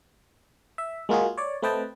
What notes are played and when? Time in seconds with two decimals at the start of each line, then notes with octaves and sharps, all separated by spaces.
0.78 E5
1.09 G#3 A#3 F4 F#4 G#4
1.38 C#5 D5
1.63 A3 C4 B4 D#5 G5 A5